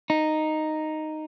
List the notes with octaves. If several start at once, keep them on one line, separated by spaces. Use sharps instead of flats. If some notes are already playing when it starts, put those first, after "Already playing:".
D#4